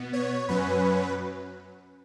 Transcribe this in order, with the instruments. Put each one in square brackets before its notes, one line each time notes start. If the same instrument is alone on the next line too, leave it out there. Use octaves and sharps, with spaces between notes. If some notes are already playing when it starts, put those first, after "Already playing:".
Already playing: [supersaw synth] B2 B3
C#5
F#2 F#3 C#4 B4